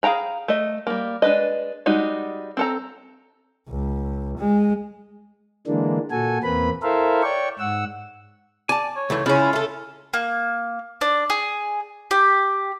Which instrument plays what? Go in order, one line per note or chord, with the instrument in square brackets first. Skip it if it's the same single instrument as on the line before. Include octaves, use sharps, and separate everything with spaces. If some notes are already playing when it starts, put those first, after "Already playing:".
[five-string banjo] G#4 F5 G5 A#5 B5
A3 D#5
G3 A#3
G#3 D4 B4 D#5
G3 G#3 D#4 F#4
C4 A4 A#5
[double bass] C#2
G#3
[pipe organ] D3 E3 G#3 A#3 D4
A#2 F#4 A4 G#5
E2 A#3 C4 B4 B5
E4 A4 A#4 C5 E5 F5
C#5 D5 G5 C#6
G#2 F#5 E6
[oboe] D5 [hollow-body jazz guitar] G#5 A5
[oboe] C#5
[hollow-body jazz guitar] C#2 E3 A3
[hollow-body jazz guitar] C#2 C#3 [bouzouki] C#4 E4 [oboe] F4
[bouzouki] A3 A4
[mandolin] A#3
D4
G#4
G4